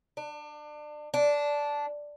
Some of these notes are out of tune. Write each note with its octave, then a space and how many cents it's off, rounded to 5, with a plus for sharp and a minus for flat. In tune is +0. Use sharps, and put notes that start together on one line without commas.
D4 +30
D4 -10